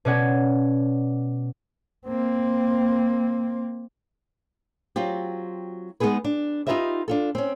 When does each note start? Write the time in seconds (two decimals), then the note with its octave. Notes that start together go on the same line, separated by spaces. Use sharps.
0.05 B2 C#4 D5 F#5 G#6
2.07 A#3 C4
4.96 F#3 C4 F4 G4
6.00 G#3 B3 C4 D#4 G#4 B4
6.24 D4
6.67 D#4 F4 G4 B4 D#5 E5
7.08 D4 F4 A4
7.35 C4 C#4